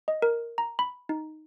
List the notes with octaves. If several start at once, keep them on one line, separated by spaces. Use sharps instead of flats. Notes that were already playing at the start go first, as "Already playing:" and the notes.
D#5
A#4
A#5
B5
D#4